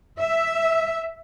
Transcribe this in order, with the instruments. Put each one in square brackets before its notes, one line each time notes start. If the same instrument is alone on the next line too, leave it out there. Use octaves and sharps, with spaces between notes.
[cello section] E5